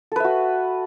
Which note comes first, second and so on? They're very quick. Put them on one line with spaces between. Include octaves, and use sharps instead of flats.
A4 B4 E5 F#4